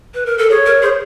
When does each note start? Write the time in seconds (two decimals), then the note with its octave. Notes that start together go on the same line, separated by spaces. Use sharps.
0.14 B4
0.26 A#4
0.38 A4
0.50 G#4 C#5
0.66 A#4
0.82 G#4 C5